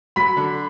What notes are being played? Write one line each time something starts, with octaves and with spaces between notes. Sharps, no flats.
F#3 B5 B6
D3